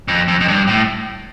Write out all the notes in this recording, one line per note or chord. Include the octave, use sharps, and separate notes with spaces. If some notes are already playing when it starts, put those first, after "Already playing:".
F2
F2
F2
G2
A2